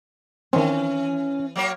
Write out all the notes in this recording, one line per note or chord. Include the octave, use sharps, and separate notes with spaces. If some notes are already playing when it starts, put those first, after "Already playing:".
D#3 E3 C4 C#4
F#3 A#3 C#5